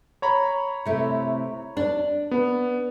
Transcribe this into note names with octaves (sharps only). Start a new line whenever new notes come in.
C#5 A#5 B5
C3 A3 E4
D4
B3